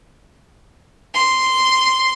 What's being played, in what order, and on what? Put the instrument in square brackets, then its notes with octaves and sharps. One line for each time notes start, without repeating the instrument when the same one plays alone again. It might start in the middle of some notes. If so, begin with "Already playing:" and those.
[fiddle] C6